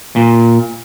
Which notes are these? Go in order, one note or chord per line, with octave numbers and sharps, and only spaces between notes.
A#2